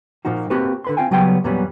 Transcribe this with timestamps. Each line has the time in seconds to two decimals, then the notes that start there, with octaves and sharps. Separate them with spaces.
0.25 A#2 F3 A#3 D#4 F#4
0.50 A#3 C4 F#4 G4 B4
0.84 D3 B4 C6
0.97 C4 C#4 F4 F5 G5 G#5
1.11 C#3 F#3 G3 B3 G5 C6
1.44 E2 A#2 F#3 G3 B3 C#4